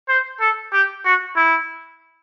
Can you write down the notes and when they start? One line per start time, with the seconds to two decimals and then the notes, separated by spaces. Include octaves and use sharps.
0.09 C5
0.40 A4
0.73 G4
1.05 F#4
1.36 E4